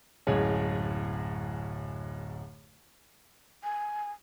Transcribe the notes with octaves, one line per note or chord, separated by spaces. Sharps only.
D1 F#2 G#3 G#4 C#5
G#5